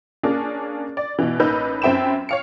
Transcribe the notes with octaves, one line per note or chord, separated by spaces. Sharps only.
A#3 C#4 D4 G#4
D5
B2 E3
A1 A#3 D#4 B4 E6 G6
F#2 C4 E5 G5 B5 E7
C#5 F5 C#7